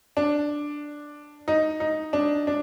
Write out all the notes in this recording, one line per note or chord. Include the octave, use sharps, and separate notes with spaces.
D4
D#4
D#4
D4
D4